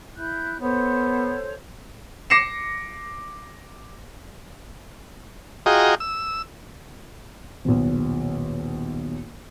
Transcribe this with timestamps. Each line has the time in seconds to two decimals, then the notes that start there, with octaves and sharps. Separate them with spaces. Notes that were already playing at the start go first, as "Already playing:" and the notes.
0.15 E4 F#6 G6
0.60 B3 A4 C5 C#5
2.30 D6 A#6 C7 C#7 E7
5.66 F4 F#4 G#4 D#5 G5 A#5
6.00 E6
7.65 D#1 B1